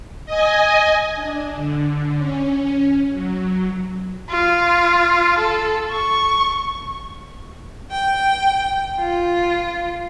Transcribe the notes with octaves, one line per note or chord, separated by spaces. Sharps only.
D#5 G#5
D4
D3
C#4
F#3
F4
A4
C#6
G5
F4